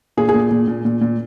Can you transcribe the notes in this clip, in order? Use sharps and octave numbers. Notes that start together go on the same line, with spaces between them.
A#2 G#4
G#4
A#2
A#2
A#2
A#2
A#2